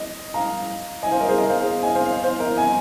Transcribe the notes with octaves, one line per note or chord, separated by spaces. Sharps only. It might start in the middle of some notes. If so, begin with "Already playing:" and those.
Already playing: D#5
F5 A#5
D#5 G#5
C5 F5
A#4 D#5
G#4 C5
A#4 D#5
C5 F5
G#4 C5
D#5 G#5
C5 F5
C5 F5
C5 F5
A#4 D#5
D#5 G#5